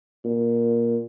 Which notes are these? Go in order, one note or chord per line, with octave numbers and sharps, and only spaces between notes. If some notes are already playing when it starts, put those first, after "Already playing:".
A#2